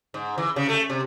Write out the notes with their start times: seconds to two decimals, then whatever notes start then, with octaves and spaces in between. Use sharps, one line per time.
0.14 G#2
0.38 E3
0.56 C#3
0.69 A3
0.90 C3